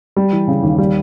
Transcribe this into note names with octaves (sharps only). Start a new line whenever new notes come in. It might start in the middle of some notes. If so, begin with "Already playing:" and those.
G3
E3
C#3
D#2
G3